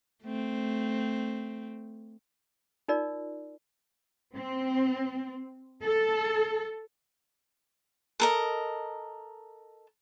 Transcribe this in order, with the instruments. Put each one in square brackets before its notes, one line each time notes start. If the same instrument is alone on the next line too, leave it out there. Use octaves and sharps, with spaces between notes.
[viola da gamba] A3 C4
[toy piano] D#4 F4 A#4 D5
[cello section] C4
A4
[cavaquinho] A4 A#4 D#5